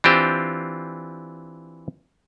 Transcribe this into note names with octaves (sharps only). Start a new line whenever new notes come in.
E3 C4 D4 F4 G4 C5